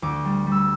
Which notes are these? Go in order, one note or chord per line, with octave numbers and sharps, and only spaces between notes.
D2 D6
G3
G3
E6